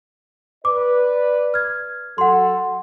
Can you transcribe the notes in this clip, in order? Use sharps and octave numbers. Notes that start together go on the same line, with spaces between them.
B4 D5 D6
F6 G#6
F#3 F#4 A4 F#5 C6